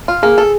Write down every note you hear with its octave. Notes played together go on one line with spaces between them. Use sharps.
F4
A#3 G#4
A4